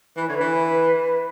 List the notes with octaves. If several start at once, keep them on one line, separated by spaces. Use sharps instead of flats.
E3 B4
D3 C#5
E3 B4